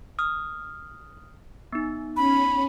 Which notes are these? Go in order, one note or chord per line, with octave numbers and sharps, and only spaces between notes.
D#6 F6
B3 D#4
C#4 B5